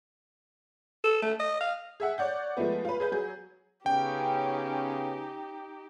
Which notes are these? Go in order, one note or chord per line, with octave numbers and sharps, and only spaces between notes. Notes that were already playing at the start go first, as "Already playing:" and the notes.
A4
A3
D#5
F5
G#4 E5 F#5
C#5 D5 F#5 G6
F3 G#3 A3 B3
F4 B4
G#4 B4 G6
F#3 G#4
C#3 B3 C#4 D#4 G4 G5